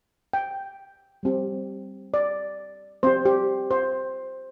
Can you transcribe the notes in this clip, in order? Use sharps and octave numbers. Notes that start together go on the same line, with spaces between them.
G5
G3 C4 G4
D5
C4 G4 C5
G4
C5